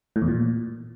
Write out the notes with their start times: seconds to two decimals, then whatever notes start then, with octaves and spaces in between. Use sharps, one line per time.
0.16 A2
0.22 E2
0.28 A#2